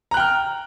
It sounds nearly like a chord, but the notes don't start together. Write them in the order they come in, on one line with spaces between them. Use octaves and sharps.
A#5 F#6 G5 F6